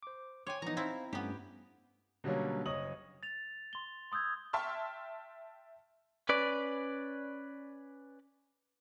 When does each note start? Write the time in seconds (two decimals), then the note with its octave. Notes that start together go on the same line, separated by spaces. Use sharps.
0.03 C5 D6
0.47 C#5 G5 G#5 C6 D6
0.62 E3 F3 B3 D#4 A#5
0.77 C4 E4 C5 F5
1.13 G2 A3 B3 C#4 G4
2.24 B2 D3 F#3 G3 A#3 C#4
2.66 F#1 C#5 D#5 D#6 F#7
3.23 A6 F7
3.73 C6 G7
4.12 C6 D#6 E6 G6 G#6
4.53 E5 G5 A5 C6 C#6 F6
6.29 C#4 B4 D5